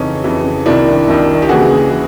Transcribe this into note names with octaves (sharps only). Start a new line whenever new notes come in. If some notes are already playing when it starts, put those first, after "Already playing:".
Already playing: F2 C#3 E3 C#4 D#4
F2 C#3 E3
C2 C3 D#3 D4 E4
C2 C3 D#3
G4
D#2 C#3 E3 F#4 G#4
C#3 E3